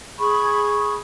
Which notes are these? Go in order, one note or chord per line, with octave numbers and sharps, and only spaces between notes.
G#4 B5 C#6